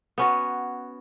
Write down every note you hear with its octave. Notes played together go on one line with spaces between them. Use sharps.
B3 C#4 F#4